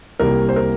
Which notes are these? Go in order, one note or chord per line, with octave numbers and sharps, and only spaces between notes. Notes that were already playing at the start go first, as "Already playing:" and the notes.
C2 C3 G3 A#3 A#4
C5
A#4